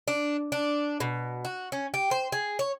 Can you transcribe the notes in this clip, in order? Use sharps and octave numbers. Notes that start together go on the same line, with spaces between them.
D4
D4
B2
F#4
C#4
G4
C5
G#4
C#5